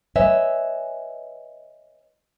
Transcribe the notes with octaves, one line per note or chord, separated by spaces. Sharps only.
B4 C#5 D#5 E5 G#5